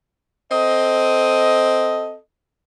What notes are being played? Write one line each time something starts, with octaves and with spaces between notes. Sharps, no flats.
C4 A4 D#5